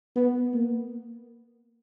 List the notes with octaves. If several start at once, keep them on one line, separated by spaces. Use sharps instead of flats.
B3
A#3